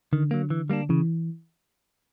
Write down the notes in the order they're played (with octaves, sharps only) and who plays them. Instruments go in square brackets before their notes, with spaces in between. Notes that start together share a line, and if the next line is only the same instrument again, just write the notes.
[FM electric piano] D3 [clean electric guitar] D#3
[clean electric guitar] F#3 A#3
E3
G3 A#3 D4
[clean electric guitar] C#3 [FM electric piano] E3